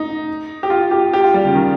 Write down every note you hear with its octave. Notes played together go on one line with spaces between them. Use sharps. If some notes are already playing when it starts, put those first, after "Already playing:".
Already playing: D#4
G4
F4
G4
G4
F4
G3
C#3
D#3